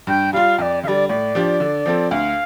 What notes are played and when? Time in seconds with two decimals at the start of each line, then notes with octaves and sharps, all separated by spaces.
0.07 G2 G5
0.33 G3 F4 F5
0.58 F2 D5 F5
0.83 D3 F5
0.88 G3 D5
1.09 A2 D5
1.35 F3 D4 G4
1.60 D3
1.86 F3 C4 A4
2.11 D2 F5